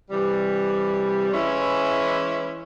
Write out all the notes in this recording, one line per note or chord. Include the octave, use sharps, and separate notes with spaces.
C3 E3 G3
E3 G#3 C#4 E4